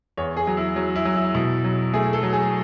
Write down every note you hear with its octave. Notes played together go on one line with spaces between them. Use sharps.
E2 C#5
G#4
F#3
E4
F#3
E4
F#3
E4
B2 E4
F#3
A3 G#4
A4
F#3
G#4